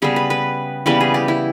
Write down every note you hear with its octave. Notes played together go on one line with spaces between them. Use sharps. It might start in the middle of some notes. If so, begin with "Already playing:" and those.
C#3 G3 B3 G#4
B4
B4
C#3 E3 G3 B3 B4
G#4
G4
E4